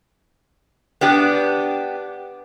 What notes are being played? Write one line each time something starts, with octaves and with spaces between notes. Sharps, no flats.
B3 D4 G4